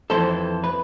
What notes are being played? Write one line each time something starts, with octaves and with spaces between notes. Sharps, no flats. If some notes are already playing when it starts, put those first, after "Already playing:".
F2 E3 A4 C5
B4